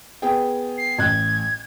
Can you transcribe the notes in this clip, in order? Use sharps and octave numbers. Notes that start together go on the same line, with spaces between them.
B3 G#4 G5
C7
A1 F#6 G#6